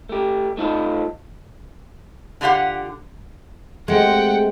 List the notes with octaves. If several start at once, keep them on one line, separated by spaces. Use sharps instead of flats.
A3 G4
A3 D#4 F4 A4
D3 F4 G4 F5 F#5
G#3 A3 C4 G4 F#5 G5